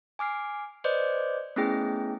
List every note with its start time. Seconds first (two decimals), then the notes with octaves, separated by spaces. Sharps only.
0.19 G#5 D6 F6 C7
0.84 B4 C5 D5 D#5 D6 G6
1.56 A3 B3 C#4 E4 G#4 G5